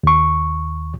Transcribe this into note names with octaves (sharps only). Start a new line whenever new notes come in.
D#2 C#6